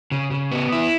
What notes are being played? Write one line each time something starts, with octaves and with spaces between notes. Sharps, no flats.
C#3
C#3
B3
E4